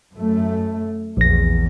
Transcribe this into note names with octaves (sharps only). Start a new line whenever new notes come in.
F#2 A3
A#1 E2 A#6